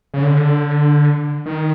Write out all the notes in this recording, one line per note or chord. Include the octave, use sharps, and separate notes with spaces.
C#3
D3
D#3